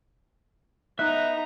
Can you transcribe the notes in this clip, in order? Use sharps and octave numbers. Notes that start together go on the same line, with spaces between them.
B3 D#4 E5 A#5 F#6